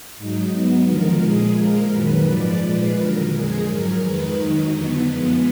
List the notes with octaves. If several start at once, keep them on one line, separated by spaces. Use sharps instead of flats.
G#2 F#3 D#4
G#2 F#3 B3
D#2 D3 F3 G#3 A#4
A#2 F3 G#3 G#4
A#2 F3 G#3 A#4
F#2 D#3 F#3 B4
G#2 F3 G#3 D5
A#2 F3 G#3 B4
D#2 D3 F#3 A#4
F2 F3 G#3 G#4
G#2 F#3 A#4
F2 D#3 G#3 B4
D#2 D#3 F#3 D#4
F2 D3 F#3 B3
F#2 F3 G#3